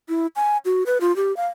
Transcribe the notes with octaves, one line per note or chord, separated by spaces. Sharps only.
E4
G#5
F#4
B4
F4
G4
F5